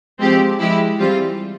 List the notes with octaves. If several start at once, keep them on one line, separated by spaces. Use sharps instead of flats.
F3 G#3 C4 G4
F3 G#3 E4 G4
E3 G3 C4 F4